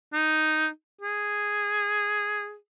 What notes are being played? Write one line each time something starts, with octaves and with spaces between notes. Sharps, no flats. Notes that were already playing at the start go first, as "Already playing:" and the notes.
D#4
G#4